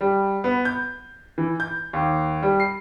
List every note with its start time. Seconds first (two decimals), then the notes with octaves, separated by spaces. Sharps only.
0.01 G3
0.44 B3
0.65 G6
1.38 E3
1.60 G6
1.93 D#2
2.42 G3
2.60 C7